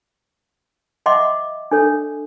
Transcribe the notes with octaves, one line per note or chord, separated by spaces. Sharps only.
D#5 E5 F#5 C6 D6
D4 A4 C#5